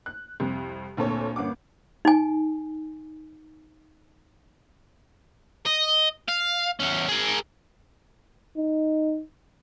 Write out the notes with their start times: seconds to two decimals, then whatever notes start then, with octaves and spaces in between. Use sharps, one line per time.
0.06 F#6
0.40 C2 F2
0.97 D2 A#2 C4 A4 C#5
1.36 G1 A#3 C#4 F#5 D6
2.05 D#4 G#5
5.66 D#5
6.29 F5
6.80 E2 C#4
7.08 G#4 A#4
8.57 D#4